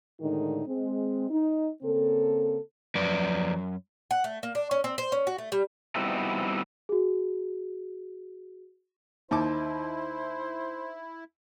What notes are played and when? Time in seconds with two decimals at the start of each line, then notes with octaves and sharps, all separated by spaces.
0.21 A2 D3 D#3 G#3 D#4
0.67 G#3 C4
1.30 D#4
1.82 C#3 A#3 C4 A4
2.95 F#2 F3 B4 D5
4.11 F#5
4.24 A3
4.43 A#3
4.55 D4
4.71 C#4
4.84 C4
4.98 C5
5.12 C#4
5.27 F#4
5.38 A3
5.52 G3
5.95 G3 B3 C4 D#4 E4 F#4
6.89 F#4 G#4
9.31 D#2 D#4 E4 C5 A5 D6